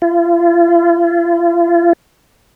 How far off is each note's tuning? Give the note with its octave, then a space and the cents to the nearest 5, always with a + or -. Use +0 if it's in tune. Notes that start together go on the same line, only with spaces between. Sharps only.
F4 -40